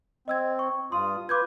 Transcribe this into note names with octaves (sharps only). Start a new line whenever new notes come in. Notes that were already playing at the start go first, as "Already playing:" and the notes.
C4 D#5 E6 G#6
C#6
G2 F4 C6 D#6
F4 B4 D6 G6 G#6